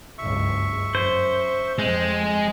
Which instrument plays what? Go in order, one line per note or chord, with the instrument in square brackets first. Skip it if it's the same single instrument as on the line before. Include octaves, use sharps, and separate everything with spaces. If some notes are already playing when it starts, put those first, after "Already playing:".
[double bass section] F#1 C#2 G2 [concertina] E5 C#6
[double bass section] F#2 [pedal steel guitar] C5
[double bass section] F2 C4 [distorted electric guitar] G#3